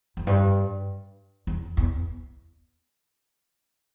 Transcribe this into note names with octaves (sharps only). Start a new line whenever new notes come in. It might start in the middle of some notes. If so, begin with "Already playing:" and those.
F2
G2
E2
E2